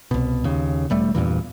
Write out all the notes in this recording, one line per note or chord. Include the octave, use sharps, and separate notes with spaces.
C2 B2
D#2 C#3
E1 G3 A3
E2 G2 A#2 E3